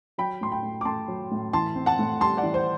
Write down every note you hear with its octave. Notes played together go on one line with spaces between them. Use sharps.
F#3 G5 B5
A2 C6
G5 B5
A2
D6
A3 A5 C6
F#3
A2
E3 A5 C6
C4
F#5 A5
A2
G3 A5 C6
D5 F#5
E3
C5